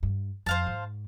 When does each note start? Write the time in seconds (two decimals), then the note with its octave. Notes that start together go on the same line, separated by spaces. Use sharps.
0.03 G2
0.46 F2 C5 F5 A5
0.67 G#2